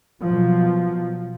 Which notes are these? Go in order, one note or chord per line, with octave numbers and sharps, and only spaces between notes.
B2 F3 F#3